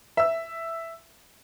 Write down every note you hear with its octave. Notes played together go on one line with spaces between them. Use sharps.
E5 E6